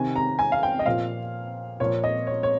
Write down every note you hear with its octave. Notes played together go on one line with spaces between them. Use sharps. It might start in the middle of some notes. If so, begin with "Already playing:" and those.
Already playing: C3 D#3 G#5
A#5
G#5
F5
G5
D#5
A#2 F3 F5
A#2 F3 C#5
D#5
C#5
C#5